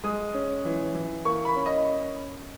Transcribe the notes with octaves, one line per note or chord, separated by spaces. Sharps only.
G#3 D#6
C#4
E3
E3
A#3 C#6
B5
C#4
D#5